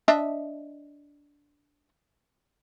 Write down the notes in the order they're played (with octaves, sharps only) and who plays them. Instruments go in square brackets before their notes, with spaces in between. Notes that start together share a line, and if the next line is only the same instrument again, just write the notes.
[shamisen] D4 D#5 E5